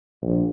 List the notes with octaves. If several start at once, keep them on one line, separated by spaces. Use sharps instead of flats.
A#1